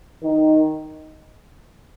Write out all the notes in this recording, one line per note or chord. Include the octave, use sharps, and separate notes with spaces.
D#3